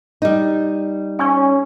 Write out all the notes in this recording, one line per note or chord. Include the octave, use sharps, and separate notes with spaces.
G3 D#4
C#4 G#5 C#6